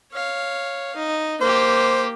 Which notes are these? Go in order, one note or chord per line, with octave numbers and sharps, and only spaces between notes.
C#5 F5
D#4
A#3 G4 C5